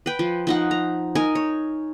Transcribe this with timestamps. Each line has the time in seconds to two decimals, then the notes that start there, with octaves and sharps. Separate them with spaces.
0.06 B4 G5
0.19 F3
0.47 F3 D#4 F#5
0.71 A#5
1.15 D#4 A#4 G#5
1.35 C#5